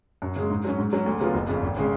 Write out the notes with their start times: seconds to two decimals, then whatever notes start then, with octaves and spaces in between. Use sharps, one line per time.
0.22 F#2
0.36 C#3 G#3
0.50 G#2
0.64 F#3 C#4
0.78 G#2
0.93 F#3 C#4
1.06 D2
1.20 C#3 F#3 B3 F4
1.34 F#1
1.49 F2 C#3
1.62 G#1
1.77 C#3 G#3 C#4